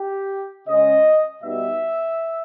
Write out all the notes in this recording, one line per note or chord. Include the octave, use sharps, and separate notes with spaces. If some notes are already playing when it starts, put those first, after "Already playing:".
Already playing: G4
C#3 G#3 C#4 D#5
B2 G3 B3 D#4 E5